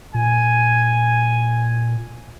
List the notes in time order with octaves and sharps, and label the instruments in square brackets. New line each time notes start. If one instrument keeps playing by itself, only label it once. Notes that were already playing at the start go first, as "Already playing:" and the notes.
[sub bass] A#2 [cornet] G#5